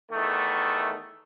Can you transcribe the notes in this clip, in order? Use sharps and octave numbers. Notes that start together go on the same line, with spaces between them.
E2 D#3 A3